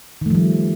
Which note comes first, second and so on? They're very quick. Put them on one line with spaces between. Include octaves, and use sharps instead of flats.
D#3 A3 F3 G3